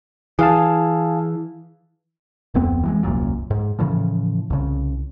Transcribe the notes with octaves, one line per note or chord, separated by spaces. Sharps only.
E3 G#4 F5 A5
D1 F2 B3 C4
E3 G3 G#3
D#1 C2 F#2 A#2
G#2
A2 C#3 E3 F3
C2 C#3